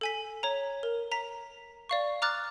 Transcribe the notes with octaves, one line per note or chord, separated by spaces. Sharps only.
A4 G#5 B6
C#5 A#5
A#4
A#5 B6
D5 F5 C#6
A#5 D6 F6 F#6 A6